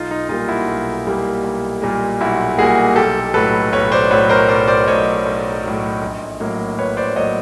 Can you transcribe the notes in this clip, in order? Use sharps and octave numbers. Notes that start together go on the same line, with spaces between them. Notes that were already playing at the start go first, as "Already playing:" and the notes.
Already playing: B1 D#4 F4
D#4 F4
A#2 G3 A#3 D#4 F4
E4 F#4
B1
A#2 G3 A#3
B1
A#2 G3 A#3
B1 E4 F#4
A#2 G3 A#3 F#4 G#4
B1 G4 A4
A2 F#3 A4 B4
B1 B4 C#5
C5 D5
A2 F#3 B4 C#5
A#4 C5
B1 C5 D5
C5 D5
A2 F#3 C#5 D#5
B1
A2 F#3
A#1
A2 F#3 A#3
A#1 B4 C#5
C5 D5
A2 F#3 A#3 C#5 D#5